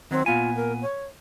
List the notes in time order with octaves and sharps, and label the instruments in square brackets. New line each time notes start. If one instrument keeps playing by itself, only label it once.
[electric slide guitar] D#3 F#3 [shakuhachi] C4
[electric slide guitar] A#2 B3 G#5 [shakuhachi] F4
[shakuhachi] A#4
C#5